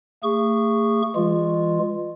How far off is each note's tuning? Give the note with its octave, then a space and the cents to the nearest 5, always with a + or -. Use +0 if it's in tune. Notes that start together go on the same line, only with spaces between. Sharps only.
A3 +40 G#4 -30 C#6 +0
E3 +10 G#3 -30 F4 +0